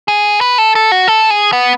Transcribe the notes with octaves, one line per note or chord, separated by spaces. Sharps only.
G#4
B4
A4
A4
F#4
A4
G#4
B3